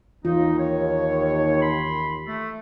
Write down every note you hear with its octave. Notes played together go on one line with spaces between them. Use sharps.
D#2 E3 D#4 F4
C#5
B5 C6
A3